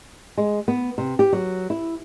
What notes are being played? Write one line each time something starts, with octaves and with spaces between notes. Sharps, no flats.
G#3
B3
C3
G4
F#3
E4